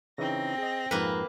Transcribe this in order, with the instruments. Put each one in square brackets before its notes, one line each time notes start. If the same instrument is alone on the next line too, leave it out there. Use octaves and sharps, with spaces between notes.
[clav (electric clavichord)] C#3 E3 D#4 [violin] C4 A#6
[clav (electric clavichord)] G#4 D#5
[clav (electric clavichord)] F2 G#2 [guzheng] A#3 B4